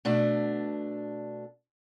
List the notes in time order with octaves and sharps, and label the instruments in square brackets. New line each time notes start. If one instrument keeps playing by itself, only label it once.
[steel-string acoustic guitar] B2 A3 D4